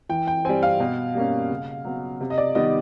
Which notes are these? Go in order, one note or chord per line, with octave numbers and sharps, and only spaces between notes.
E3 G5
G5
G3 C4 G#5
F5
B2
G3 A#3 C#4
C#3
F#3 B3
C3
D#5
D5
D#3 G3 B3 D#5